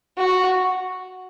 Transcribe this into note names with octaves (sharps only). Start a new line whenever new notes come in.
F#4